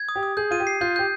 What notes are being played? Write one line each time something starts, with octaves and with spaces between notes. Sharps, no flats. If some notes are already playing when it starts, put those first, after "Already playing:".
Already playing: G#6
D#6
G4
D#6
G#4 G6
F4 D#7
G4
C7
F4 G6
G4 G6